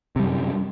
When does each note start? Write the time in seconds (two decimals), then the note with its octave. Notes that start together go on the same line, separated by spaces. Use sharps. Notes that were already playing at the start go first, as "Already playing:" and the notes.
0.16 C3
0.19 G3
0.23 F#2